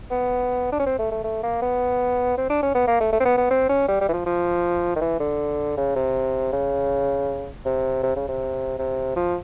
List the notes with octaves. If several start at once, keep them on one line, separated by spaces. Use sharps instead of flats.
B3
D4
C#4
C4
A3
A3
A3
A#3
B3
C4
D4
C#4
B3
A#3
A3
A3
C4
B3
B3
C4
C#4
G3
G3
E3
F3
F3
D#3
E3
D3
C#3
C3
C#3
C3
C3
C#3
C3
C3
F3